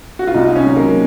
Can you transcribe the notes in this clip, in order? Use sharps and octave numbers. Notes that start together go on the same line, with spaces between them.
F#4
F4
C2 D#4
C#4
F#3
A#3